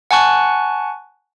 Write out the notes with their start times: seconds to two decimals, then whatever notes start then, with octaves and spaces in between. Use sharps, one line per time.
0.11 F#5 G#5 A5 C#6 F#6